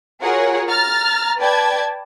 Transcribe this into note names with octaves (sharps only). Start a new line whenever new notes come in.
F4 F#4 G#4 A#4 C#5 F#5
A#5 F6 A6
B4 D5 G5 A5 G#6